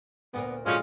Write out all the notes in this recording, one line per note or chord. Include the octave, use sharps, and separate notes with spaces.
D2 A#2 A#3 B3
A#2 D3 F3 F#3 G#3 C#4 F4